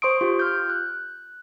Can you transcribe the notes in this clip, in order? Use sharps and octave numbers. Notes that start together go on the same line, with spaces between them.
C5 C6 C#6 D#6 D7
F4 G4
F6 G6
F#6